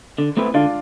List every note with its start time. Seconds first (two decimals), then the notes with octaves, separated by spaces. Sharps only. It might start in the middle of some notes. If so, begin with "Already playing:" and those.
0.18 D3
0.37 A3 C4 E4 B4
0.54 D3 D4 F4